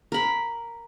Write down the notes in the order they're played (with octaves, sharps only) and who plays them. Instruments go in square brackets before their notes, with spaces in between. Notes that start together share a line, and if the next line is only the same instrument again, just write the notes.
[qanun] A#4 B5